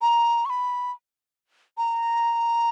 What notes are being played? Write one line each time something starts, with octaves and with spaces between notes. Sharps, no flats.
A#5
C#6
B5
A#5